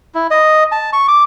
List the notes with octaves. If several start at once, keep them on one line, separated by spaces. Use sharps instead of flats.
E4
D#5
A5
C#6
D6